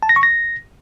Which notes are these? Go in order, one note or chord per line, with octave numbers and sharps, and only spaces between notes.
A5
A#6
C#6
A#6